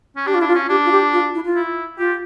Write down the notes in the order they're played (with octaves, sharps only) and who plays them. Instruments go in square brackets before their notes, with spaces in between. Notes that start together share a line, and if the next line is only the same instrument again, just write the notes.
[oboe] C#4
[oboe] D4 [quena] G4
[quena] F4
[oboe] D4 [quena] E4
[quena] F4
[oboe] C#4
[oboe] D4 [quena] G4
[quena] F4
G4
F4
E4
F4
[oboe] E4
[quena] F4 [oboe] G4